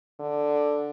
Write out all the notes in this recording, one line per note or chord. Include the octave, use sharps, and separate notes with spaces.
D3